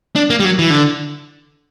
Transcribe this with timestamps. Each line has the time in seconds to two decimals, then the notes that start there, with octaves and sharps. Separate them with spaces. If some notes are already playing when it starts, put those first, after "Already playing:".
0.16 D4
0.30 A#3
0.40 G3
0.45 F#3
0.59 E3
0.70 D3